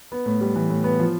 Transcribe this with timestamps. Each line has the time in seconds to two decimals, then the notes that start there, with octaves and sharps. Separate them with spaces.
0.12 B3
0.26 A2
0.41 G3
0.56 E3
0.70 A2
0.84 B3
1.00 F3